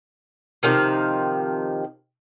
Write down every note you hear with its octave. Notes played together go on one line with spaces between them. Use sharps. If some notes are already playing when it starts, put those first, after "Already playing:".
C3 D#3 F3